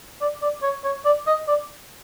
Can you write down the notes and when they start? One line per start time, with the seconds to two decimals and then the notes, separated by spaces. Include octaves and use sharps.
0.21 D5
0.42 D5
0.63 C#5
0.85 C#5
1.05 D5
1.27 D#5
1.48 D5